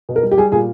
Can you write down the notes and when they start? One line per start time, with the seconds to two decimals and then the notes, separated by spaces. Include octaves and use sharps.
0.09 B2
0.16 A#4
0.23 G3
0.31 G4
0.37 G3 G#4
0.52 A#2 G#4